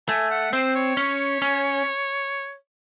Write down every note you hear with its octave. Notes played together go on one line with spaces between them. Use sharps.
A3 G#5
F#5
C4 C5
C#5
C#4
C#4